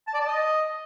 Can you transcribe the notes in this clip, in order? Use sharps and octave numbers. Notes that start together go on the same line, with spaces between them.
A5
D5
A5
D#5